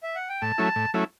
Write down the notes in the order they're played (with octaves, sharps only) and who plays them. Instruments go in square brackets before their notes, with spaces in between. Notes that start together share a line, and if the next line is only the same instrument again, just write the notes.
[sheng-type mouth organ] E5
F#5
G5
[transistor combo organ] A2 [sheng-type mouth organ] A5
[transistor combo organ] F#3 A3 C#4 E4
A2
F#3 A3 C#4 E4